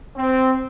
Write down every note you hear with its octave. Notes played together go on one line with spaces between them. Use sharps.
C4